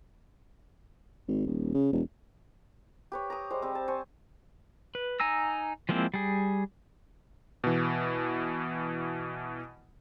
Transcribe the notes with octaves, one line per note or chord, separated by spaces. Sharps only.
G#1
D#1
C#3
E1
G4 B4 C#5
A#5 D#6
G3 G#3 C5
G3 C4
A5
C5 G#5 C#6
B4
D#4 G#5 A#5 E6
F3 G#3 A#3 C4 E4
G3 G#4
B2 E3